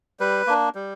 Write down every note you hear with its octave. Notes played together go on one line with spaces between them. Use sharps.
G3 B4
A#3 D4
G3